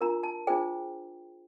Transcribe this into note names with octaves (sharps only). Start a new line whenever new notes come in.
D4 F4 A#4 A#5
A5
D4 F4 G#4 C5 G5